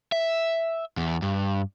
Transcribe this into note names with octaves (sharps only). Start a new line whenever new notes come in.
E5
E2
G2